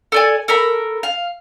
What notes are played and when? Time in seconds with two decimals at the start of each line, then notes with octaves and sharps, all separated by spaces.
0.12 A4 D5 G#5
0.48 A4 A#4 A#5 B5
1.03 F5